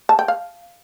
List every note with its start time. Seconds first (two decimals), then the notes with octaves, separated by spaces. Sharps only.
0.09 A5
0.19 G5
0.28 F5